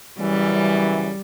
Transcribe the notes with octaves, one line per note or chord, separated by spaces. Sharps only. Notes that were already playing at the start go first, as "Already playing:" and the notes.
F#2 C#3 E3 G3